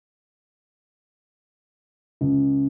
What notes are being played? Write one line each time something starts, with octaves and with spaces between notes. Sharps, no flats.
C#2